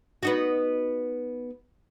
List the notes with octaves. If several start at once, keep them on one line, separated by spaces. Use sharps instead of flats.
B3 D#4 F#4